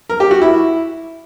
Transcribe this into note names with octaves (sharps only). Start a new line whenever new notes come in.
A#4
G4
F#4
E4